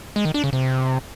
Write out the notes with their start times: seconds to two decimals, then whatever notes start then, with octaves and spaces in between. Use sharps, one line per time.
0.16 G#3
0.25 D#3
0.34 D4
0.44 C#3
0.53 C3